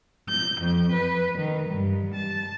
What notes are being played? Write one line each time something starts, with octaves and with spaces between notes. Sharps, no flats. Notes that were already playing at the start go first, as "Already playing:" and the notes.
G6
F2
B4
D#3
G2
A5